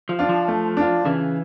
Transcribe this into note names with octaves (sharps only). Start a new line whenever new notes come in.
F3
D4 F4
F3
A3
D4 F4
C#3 E3